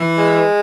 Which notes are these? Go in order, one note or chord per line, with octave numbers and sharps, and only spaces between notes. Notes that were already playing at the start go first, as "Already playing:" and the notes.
Already playing: E3
G#3